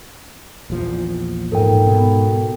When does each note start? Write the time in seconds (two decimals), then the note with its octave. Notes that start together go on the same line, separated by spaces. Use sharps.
0.70 A#1 E2 F3
1.52 G#2 A4 A#4 G5
1.87 B2